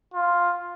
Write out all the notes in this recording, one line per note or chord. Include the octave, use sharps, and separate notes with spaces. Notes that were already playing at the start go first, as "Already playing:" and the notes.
F4